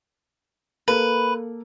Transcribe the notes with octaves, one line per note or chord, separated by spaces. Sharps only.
A#3 A4 B4